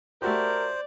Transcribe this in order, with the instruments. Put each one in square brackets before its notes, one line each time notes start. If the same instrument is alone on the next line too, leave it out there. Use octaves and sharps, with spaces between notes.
[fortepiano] A3 F#4 G4 [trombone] A#4 [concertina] C5 [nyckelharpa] D5